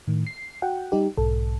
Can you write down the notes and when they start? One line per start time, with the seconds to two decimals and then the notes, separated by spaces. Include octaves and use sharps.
0.08 A2 D#3
0.27 C7
0.62 F#4 F#5 G5
0.92 G3 D#4 G4
1.17 B1 G#2 A4